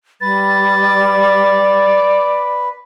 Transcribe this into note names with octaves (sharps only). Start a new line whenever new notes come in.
G3 B4 A6
D5